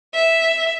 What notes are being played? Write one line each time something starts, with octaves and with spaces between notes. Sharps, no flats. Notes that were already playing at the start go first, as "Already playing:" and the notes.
E5